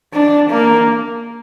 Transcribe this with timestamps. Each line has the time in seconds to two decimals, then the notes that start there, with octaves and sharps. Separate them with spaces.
0.14 D4
0.50 A#3